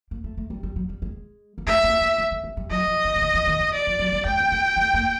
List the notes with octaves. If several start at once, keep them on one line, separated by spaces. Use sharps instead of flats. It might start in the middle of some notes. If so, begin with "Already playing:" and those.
A#3
A3
A3
G3
G3
F#3
G3
G#3
A#3
A3 E5
A#3
A3
A#3
A3
G#3
G3
F#3 D#5
F3
D#3
D3
D#3
E3
D#3
E3
D5
F3
F#3
G3
G#3 G5
A#3
A3
A3
A#3